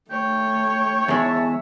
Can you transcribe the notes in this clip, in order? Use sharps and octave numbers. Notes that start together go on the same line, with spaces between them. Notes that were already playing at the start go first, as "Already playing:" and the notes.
A3 C#5 G5
E2 G#3 E5 A5